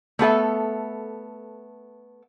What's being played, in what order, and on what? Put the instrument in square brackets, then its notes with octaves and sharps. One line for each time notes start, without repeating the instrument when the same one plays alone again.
[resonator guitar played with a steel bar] A3 B3 A4 E5